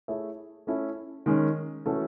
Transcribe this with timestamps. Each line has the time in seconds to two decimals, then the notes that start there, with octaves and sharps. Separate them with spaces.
0.08 A3 E4 G#4 C#5 E5
0.67 A3 C#4 E4 A4
1.26 D#3 G#3 C#4
1.86 E3 A3 C#4 F#4 A4